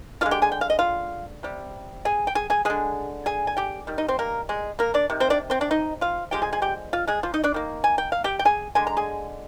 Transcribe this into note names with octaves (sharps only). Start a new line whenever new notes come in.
D3 G#3 F4 F5
G4 G5
G#4 G#5
G5
F5
D#5
F4 F5
C3 G3
G#4 G#5
G5
G#4 G#5
G#4 G#5
D3 G#3 G#4 G#5
G#4 G#5
G#5
G4 G5
D#3 G3
D#4 D#5
C4 C5
A#3 A#4
G#3 G#4
A#3 A#4
D4 D5
C3 D#3
C4 C5
D4 D5
C4 C5
D4 D5
D#4 D#5
F4 F5
D3 F3 G#3 G4 G5
G#4 G#5
G#4 G#5
G4 G5
F4 F5
G#3 G#4
F3 F4
D#4 D#5
D4 D5
D#3 A#3
G#5
G5
F5
G4 G5
G5
G#4 G#5
D3 G#3 G#5
A#5
G#4 G#5